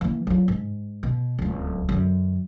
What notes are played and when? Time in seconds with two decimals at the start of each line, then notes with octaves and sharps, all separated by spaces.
0.01 E3 A#3
0.27 F#3 F4
0.48 G#2
1.03 B2
1.39 D1 C#2
1.89 F#2 D3